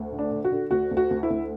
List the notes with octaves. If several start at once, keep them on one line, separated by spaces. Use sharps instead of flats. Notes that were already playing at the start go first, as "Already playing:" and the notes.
Already playing: D2
D3
D4
D3
F#4
D3
D2 F#4
D2
F#4
D2
E4
D2